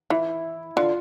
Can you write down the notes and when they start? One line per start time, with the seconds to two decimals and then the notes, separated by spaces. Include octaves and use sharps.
0.10 E3 E4
0.76 D3 F4